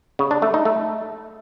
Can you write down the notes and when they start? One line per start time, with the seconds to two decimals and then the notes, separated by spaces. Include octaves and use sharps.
0.19 C#3
0.31 D4
0.42 A3
0.54 D#4
0.65 A3